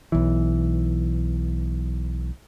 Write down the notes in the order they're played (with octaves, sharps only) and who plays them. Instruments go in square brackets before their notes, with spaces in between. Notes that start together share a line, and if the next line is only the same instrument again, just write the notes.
[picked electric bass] B1 E3